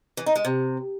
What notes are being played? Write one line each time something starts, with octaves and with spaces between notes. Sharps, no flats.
E3
D#4
G#3
C3